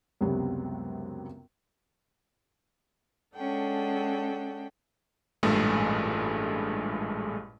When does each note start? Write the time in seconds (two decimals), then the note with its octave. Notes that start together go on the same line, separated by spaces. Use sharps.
0.21 C#2 F#2 C3 F#3 G3 B3
3.35 G#3 C#4 D4 A4 F#5 G5
5.43 A1 G2 A#2 G#3 A3 G#4